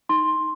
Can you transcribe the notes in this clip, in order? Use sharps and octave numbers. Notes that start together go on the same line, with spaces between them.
D#4 C6